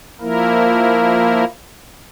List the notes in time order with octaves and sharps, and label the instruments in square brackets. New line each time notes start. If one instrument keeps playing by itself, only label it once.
[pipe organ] F3 A#3 E4 A#4